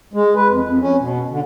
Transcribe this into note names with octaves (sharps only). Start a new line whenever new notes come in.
G#3
B4
F2
F2
C#4
B2
D3